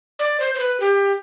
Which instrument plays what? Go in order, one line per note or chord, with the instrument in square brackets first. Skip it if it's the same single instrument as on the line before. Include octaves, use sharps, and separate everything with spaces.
[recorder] D5
C5
C5
B4
G4